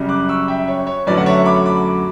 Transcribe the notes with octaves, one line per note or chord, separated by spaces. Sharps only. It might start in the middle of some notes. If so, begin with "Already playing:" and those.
Already playing: F#2 C#3 G3
D6 F#6
C#6 E6
E5 G5
C#5
C#5
F#2 D3 F#3 A3 B4 D5
F#5
C#5 E5
B5 D6
B5 D6